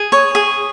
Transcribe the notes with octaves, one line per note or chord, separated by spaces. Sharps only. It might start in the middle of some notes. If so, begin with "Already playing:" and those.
Already playing: G#4
C#5
G#4